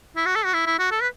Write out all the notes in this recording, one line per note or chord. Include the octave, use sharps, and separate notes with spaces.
E4
F#4
A4
F#4
E4
E4
F#4
A4
B4